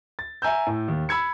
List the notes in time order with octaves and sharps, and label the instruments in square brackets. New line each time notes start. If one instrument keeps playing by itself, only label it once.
[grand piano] A6
E5 G#5 A#5 E6 G6
A2
D#2
B5 E6 G#6 C#7